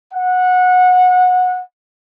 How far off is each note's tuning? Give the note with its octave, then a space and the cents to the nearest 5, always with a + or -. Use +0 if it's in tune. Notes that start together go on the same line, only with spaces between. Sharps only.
F#5 -20